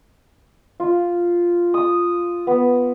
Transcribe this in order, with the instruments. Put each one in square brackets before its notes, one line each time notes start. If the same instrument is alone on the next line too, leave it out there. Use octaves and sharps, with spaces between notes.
[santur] F4
D#6
B3